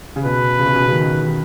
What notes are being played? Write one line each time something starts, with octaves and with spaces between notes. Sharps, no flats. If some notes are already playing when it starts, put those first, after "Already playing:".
C#3
B2 B4
C#3
B2
C#3
C#3
D#3
D#3